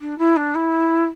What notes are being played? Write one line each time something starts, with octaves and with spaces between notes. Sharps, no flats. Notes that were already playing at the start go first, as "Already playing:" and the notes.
D4
E4
D4
E4